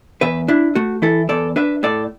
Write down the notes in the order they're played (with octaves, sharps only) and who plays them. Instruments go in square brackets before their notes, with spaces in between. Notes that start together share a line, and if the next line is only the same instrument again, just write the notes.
[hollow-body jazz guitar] E2 B4 E5
D4 E4
A3 F#4
E3 E4 A4
E2 A4 D5
D4 B4 E5
A2 A4 D5